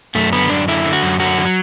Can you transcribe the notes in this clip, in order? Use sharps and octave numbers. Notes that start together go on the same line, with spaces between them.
F#2 A3
D3 B3
F#2 D4
D3 E4
D3
F#4
F#2
D3 F#4
D3
F#3